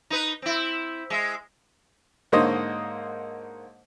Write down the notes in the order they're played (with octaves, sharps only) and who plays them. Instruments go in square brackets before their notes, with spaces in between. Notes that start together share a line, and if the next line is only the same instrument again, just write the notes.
[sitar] D#4 B4
C4 E4
G#3 E5
[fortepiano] G#2 D3 A#3 C5 C#5 D#5